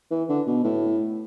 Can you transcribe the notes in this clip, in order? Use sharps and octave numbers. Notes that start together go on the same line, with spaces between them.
E3
D3
B2
A2